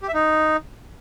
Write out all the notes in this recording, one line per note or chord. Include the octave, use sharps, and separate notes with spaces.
G4
E5
D#4